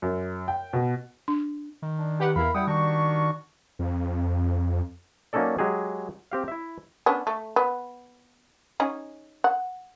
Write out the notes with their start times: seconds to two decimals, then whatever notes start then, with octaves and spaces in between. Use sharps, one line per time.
0.02 F#2
0.48 G5
0.73 B2
1.28 D4
1.82 D#3
1.98 D4
2.20 G4 B4 F#5
2.36 E2 E4 A#4 F5 B5
2.55 G3 E4 F#5 G5 D#6
2.67 D#3 D4 F#4 C#6
3.79 F2
5.33 F#3 A#3 C#4 D#4 A4 D5
5.59 F#3 G#3 G4 G#4
6.32 C4 G4 F5
6.48 E4 E5
7.06 B3 C#4 D4
7.27 A3
7.56 B3
8.80 C#4 D#4 G#4
9.44 F#5